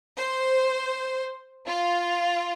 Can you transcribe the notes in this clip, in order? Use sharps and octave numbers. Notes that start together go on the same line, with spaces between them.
C5
F4